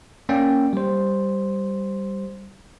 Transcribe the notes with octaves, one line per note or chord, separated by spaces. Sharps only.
A#3 C#4 D5 G5
G3 C5